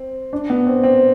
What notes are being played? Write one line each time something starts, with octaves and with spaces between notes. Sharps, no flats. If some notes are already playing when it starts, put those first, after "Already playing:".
Already playing: C4
D4
B3
C4
C4